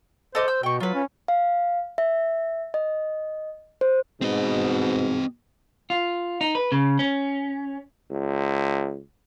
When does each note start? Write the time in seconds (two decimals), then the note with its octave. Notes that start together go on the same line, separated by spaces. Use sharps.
0.35 A4 C5 D#5 D6
0.48 E6 G6
0.63 B2 G5 C#6
0.80 F#3 F4 B4
0.94 C#4
1.28 F5
1.98 E5
2.74 D#5
3.81 C5
4.21 G#2 B2 C4 D#5
5.90 F4
6.41 D#4
6.55 B4
6.72 C#3
6.99 C#4
8.11 C#2